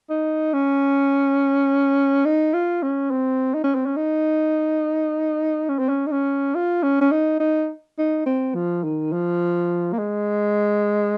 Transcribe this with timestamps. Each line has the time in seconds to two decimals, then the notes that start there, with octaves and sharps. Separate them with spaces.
0.10 D#4
0.53 C#4
2.25 D#4
2.54 F4
2.82 C#4
3.11 C4
3.54 D#4
3.64 C#4
3.75 C4
3.86 C#4
3.97 D#4
5.69 C#4
5.79 C4
5.89 C#4
6.07 D#4
6.12 C#4
6.55 F4
6.83 C#4
7.01 C#4
7.11 D#4
7.40 D#4
7.98 D#4
8.26 C4
8.55 F3
8.84 D#3
9.13 F3
9.93 A#3
9.98 G#3